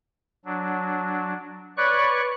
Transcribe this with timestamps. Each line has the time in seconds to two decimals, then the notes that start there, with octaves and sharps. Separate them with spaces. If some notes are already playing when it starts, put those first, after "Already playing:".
0.45 F#3 D4
1.77 B4 C#5 D5 C#6 F#6